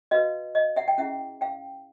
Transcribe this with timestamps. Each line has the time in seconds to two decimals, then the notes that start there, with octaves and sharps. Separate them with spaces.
0.11 F#4 B4 D#5 F5
0.55 D#5 F5
0.76 E5 F#5
0.88 G5
0.98 C#4 E4 G#4 E5 F#5
1.41 F5 G5